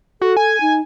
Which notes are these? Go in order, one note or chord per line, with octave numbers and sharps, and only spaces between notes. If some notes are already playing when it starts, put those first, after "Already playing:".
F#4 A4
G#5
D#4